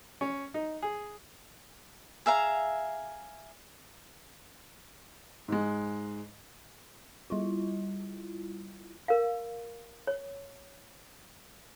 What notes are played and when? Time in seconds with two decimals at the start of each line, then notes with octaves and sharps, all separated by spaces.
0.21 C#4
0.54 D#4
0.82 G#4
2.26 G#4 E5 F5 A#5
5.48 G#2 G#3
7.30 G3 E4 F4
9.08 A#4 F5
10.07 C#5